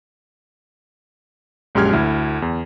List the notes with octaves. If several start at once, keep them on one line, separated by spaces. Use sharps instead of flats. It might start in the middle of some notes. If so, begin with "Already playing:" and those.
A#1 F#2 G#3 G4 F6 G#6
D2 E4
E2